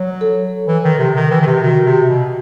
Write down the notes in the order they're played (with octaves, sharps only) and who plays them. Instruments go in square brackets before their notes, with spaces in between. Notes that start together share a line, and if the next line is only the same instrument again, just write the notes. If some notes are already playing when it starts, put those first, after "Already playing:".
Already playing: [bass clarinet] F#3
[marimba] A4
[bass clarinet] E3
D#3
C3
D#3
E3
D#3
C3
[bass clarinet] D#3 [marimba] F#4
[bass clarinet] C3
B2